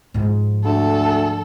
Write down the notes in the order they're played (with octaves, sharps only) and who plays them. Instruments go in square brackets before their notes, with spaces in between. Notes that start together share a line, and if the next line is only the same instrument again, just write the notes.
[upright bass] G#2 F3
[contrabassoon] D2 [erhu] A4